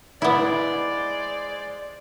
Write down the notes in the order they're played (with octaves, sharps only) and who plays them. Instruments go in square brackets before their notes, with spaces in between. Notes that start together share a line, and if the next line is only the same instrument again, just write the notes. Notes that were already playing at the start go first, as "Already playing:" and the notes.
[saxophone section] G#3 C5 D5 [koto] B3 E4